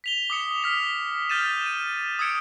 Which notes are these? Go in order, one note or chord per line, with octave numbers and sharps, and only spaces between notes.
B6 F7 G7
D6 D#6 C#7
F6 B6 G7
F6 G6 A6 D#7 E7
D#7
D#6 E6 G#6 C#7 D7